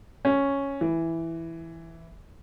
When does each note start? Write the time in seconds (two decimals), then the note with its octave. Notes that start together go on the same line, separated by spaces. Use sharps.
0.25 C#4
0.81 E3